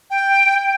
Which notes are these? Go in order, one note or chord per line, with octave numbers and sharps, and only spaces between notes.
G5